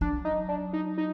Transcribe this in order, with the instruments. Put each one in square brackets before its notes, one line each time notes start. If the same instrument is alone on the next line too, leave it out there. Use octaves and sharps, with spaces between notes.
[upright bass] F#3 [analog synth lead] D4
[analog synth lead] D#4
D4
D#4
D#4